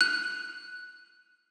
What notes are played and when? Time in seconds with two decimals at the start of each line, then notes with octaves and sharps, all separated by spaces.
0.01 F#6